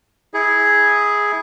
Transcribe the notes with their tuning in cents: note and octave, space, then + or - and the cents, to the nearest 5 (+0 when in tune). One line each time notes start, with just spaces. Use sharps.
E4 -25 G#4 +0